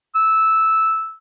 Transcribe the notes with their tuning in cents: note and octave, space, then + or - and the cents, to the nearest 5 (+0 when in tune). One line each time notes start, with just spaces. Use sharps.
E6 -10